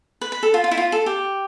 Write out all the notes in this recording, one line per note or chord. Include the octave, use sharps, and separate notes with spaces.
B4
B4
A4
F4
F4
E4
F4
A4
G4